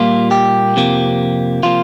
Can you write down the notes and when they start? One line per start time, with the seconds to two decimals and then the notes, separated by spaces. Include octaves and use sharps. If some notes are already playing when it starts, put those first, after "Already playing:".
Already playing: A#2 G3 A#3 F4
0.31 G4
0.76 F2 C3 F3 A#3
1.63 C3 F3 A#3 F4